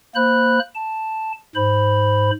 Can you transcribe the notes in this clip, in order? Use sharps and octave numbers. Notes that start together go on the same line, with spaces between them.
A#3 C5 B5 F#6
A5
G#2 C5 B5